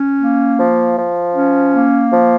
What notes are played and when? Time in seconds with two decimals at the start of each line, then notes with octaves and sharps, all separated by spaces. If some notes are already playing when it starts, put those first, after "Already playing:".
Already playing: C#4
0.18 A#3
0.58 F3
0.96 F3
1.35 C#4
1.73 A#3
2.12 F3